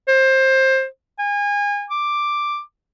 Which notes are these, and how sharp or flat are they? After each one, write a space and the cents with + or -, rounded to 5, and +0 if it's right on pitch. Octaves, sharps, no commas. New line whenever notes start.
C5 +20
G#5 -30
D6 +5